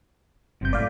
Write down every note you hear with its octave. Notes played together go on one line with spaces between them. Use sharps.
G1 F#2 C3 G6
A2 A3 D5 F5